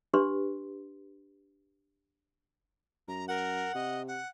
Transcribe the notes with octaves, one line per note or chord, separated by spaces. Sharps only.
D4 G4 B4 C6
F#2 A#5
A#4 F#5
C3 D#5
F#5